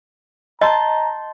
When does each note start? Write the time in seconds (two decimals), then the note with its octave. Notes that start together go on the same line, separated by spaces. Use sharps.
0.61 D#5 A5 A#5 C6 G6